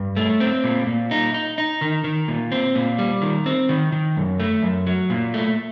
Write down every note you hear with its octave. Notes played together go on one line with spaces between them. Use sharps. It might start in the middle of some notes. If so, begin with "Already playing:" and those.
Already playing: G2
A3
C4
A#2
A#2
D#4
D#4
D#4
D#3
D#3
A#2
C4
A#2
G3
D#3
C4
D#3
D#3
F#2
A3
F#2
F#3
A#2
A3